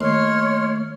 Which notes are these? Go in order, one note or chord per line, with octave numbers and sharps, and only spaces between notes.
D#2 A3 C#5 C6 F6